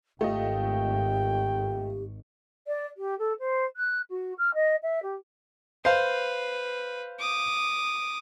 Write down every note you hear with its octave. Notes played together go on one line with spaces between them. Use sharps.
G#1 A3 F4 G4 D#5 G5
D5
G4
A4
C5
F#6
F#4
F6
D#5
E5
G4
B4 C5 F5
D6 D#6